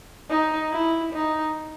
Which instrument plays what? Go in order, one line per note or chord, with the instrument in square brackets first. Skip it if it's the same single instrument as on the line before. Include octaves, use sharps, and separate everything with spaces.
[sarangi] D#4
E4
D#4